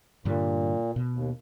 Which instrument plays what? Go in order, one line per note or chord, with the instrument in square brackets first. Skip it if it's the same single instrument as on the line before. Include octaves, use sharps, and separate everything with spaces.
[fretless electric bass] G2 D3 G3 [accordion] A#2
[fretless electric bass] B2
[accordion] D#2